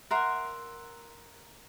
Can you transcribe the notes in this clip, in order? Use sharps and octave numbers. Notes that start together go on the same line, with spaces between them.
A#4 E5 F#5 C6